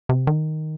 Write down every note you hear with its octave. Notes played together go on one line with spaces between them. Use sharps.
C3
D#3